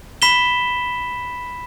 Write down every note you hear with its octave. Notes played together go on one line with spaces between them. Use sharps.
B5 B6 E7 G7